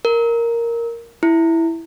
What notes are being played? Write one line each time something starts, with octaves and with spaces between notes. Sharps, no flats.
A#4
E4